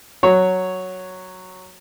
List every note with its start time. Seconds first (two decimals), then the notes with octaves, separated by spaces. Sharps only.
0.23 F#3 C#5